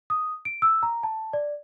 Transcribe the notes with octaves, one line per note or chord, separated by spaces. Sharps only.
D#6
D7
E6
A#5
A5
D5